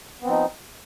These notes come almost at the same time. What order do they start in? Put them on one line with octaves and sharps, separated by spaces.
B3 C4 F3 D#4